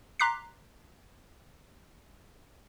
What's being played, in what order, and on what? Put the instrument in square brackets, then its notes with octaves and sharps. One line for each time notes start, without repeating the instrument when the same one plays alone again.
[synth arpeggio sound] A#5 C6 D6 F#6 B6 C7